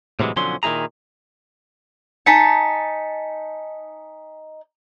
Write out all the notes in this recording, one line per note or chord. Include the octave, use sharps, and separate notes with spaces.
A2 C3 E3 F#3 G#3
B1 D3 F3 F#3 C#4 C6
A#2 D#3 C#4 E4 G#4 A#5
D#4 G#5 A5 B6 C#7